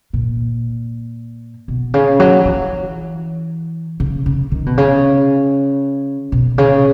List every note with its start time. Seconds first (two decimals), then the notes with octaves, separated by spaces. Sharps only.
0.13 A#2
1.68 B2
1.94 C#3
2.20 F#3
2.45 E3
4.00 C#3
4.26 C#3
4.52 D#3
4.66 B2
4.77 C#3
6.32 B2
6.58 C#3